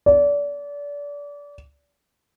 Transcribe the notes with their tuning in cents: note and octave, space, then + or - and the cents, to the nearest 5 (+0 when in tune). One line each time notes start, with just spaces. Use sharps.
D5 -30